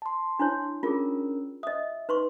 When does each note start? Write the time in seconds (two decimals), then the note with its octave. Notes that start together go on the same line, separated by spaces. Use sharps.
0.02 A5 C6
0.39 D4 E4 C#5
0.83 C#4 D4 F4 G#4 A#4
1.63 D#5 E5 D#6
2.09 D#4 B4 C6 C#6